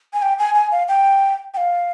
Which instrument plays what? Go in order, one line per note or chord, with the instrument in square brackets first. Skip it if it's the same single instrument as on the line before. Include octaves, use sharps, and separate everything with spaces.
[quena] G#5
G5
G#5
G#5
F5
G5
G5
F5